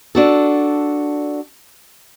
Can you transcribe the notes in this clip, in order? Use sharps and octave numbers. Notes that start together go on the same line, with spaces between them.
D4 F#4 A4